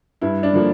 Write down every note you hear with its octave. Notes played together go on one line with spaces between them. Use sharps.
G2 E4
D4
D3 F3 A#3